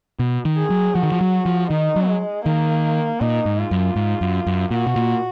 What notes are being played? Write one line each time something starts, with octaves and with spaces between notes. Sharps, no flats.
B2
D#3
G#4
F#3
F3 F#4
D#3
F3
F#3
F3
D#3 D#4
F#3
G#3
D#3 A#3
A#2 D#4
G#2
F4
F#2
G#2
F#2
F#2
A#2 F#4
B2
A#2